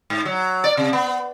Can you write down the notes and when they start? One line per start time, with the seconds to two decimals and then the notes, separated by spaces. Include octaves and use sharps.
0.10 G#2
0.25 F#3
0.64 D5
0.77 C3
0.93 B3